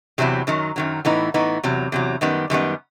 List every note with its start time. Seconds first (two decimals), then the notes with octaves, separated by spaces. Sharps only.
0.18 E2 C3 F#3 C4 E4
0.47 F#2 D#3 F#3
0.76 F#2 D#3 F#3
1.05 A2 E3 B3 D#4
1.34 A2 E3 B3 D#4
1.63 E2 C3 F#3
1.92 E2 C3 F#3
2.21 F#2 D#3 G3 B3
2.50 F#2 D#3 G3 B3